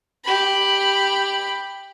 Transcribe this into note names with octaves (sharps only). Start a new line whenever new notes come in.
G4 B5